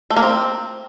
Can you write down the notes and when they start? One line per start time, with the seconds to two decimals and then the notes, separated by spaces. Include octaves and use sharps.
0.10 A3
0.16 A#3
0.22 C4